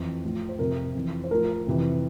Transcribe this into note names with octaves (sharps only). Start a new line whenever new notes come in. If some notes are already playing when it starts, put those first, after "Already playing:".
Already playing: F2 E3
A2 F3
C5
F2 C3 F3 A#4
F2 E3
C5
A2 F3 A#4
F2 C3 E3